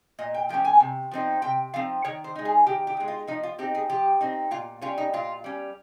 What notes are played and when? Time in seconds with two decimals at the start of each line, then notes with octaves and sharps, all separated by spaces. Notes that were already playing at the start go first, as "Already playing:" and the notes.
0.19 A#2 D#5
0.34 G5
0.49 F3 A#3 C#4 G5
0.65 G#5
0.80 C3
1.11 F3 C4 D#4
1.42 C3 G5
1.74 F3 C4 D#4 F5
2.05 D#3 C#5
2.24 C5
2.35 G#3 D#4
2.45 G#4
2.66 D#3 G4
2.87 G4
2.97 G#3 D#4
3.08 F4
3.27 F3 D#4
3.43 F4
3.58 C4 D#4 G4
3.75 G#4
3.89 F3 G4
4.21 C4 D#4
4.51 A#2 F4
4.81 G3 C#4 F4
4.98 D#4
5.13 A#2 F4
5.44 G3 C#4